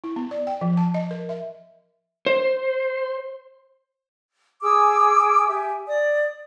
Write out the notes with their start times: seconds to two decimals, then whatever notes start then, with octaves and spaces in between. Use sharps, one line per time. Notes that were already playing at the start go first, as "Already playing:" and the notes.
0.04 E4
0.16 B3
0.31 D5
0.47 G5
0.61 F3
0.77 A5
0.94 D#5
1.11 A#4
1.29 E5
2.26 C5
4.62 G#4 G#5 D6 E6
5.48 G4 E5 G#5
5.88 D5 D#6